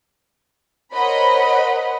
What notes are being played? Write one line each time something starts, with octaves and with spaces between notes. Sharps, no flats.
A#4 C5 C#5 D#5 F#5 B5